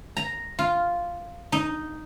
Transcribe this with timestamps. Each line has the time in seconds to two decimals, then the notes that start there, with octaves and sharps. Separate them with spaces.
0.17 A#5
0.59 F4
1.52 D#4